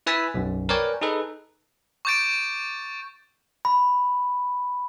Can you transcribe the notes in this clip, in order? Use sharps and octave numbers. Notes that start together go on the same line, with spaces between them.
E4 B4 G#5 E6 A6 B6
B1 F#2
A#4 B4 C#5 D5 G5 G#5
D#4 G#4 A4 B4
C#6 D6 G6 A6 D7
B5